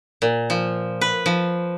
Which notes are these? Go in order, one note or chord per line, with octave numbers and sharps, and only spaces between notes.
A#2
F3
B4
F3